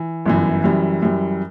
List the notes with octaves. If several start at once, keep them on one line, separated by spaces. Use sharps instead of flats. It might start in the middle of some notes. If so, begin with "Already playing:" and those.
Already playing: E3
G1 F#2 E3
F#2 E3 G3
F#2 E3 G3